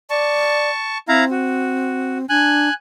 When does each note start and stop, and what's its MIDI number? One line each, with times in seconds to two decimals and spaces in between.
0.10 0.70 74
0.10 0.98 81
0.10 0.98 85
1.08 2.26 60
1.08 1.25 64
1.08 1.25 77
1.08 1.25 82
1.31 2.18 66
2.29 2.69 62
2.29 2.74 80
2.29 2.74 90